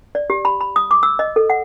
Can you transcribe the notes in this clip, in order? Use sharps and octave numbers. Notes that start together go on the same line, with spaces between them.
D5
G4
B5
B5
D#6
D6
E6
D#5
A4
F#5